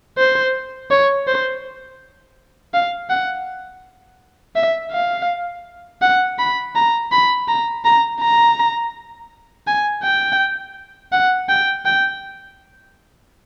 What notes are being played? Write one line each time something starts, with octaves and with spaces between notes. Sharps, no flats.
C5
C#5
C5
F5
F#5
E5
F5
F#5
B5
A#5
B5
A#5
A#5
A#5
G#5
G5
F#5
G5
G5